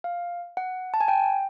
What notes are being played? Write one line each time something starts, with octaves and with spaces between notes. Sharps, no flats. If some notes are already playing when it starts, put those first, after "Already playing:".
F5
F#5
A5
G#5
G5